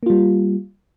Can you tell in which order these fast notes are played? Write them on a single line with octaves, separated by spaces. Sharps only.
A#3 F4 G3